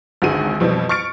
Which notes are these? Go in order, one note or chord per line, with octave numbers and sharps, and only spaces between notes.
G#1 C#2 D3 F#4 G#4 D#7
F2 B2 E3 G3 C4
C#6 F6 A6 C#7 D7